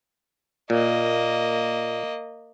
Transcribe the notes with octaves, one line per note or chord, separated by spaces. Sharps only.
A#2 A#3 D#5